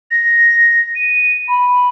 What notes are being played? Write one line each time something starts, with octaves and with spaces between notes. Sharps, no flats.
A#6
D#7
B5